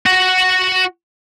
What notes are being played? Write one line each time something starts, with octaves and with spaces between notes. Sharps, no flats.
F#4 F#5